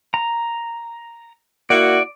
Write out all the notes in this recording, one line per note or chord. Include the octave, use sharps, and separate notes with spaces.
A#5
A#3 E4 F#4 D5